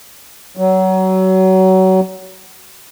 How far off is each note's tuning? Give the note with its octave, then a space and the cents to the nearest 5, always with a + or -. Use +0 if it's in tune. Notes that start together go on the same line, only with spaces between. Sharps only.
F#3 +25